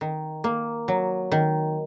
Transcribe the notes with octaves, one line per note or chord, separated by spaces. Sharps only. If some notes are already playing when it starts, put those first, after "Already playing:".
D#3
A#3
F#3
D#3